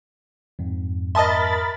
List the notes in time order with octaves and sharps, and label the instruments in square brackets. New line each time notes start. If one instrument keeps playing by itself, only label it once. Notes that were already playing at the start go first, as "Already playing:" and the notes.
[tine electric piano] F2 G#2
[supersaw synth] A#4 B5 A6 [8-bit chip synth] D#5 C6 [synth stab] E5 A5 D#6